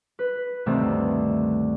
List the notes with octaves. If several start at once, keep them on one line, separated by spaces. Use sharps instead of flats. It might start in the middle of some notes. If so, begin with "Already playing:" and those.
B4
D2 G2 C3 D#3 A3 C4